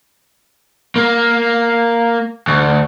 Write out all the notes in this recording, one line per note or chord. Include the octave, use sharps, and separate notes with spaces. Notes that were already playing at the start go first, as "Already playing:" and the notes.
A#3
D2